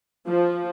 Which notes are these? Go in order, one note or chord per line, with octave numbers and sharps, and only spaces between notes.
F3